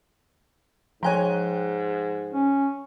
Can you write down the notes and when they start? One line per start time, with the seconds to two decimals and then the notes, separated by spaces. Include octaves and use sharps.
1.03 G#2 F3 C#5 G5 G#5 A#5 F#6
2.31 C#4